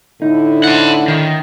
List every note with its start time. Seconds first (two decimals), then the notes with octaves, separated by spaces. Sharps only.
0.22 A2 D3 D#4 E4
0.64 C5 F#5
1.08 D#3